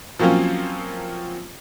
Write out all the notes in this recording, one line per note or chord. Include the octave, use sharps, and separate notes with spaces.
F3 F#3 A#3 C4 C#4 F4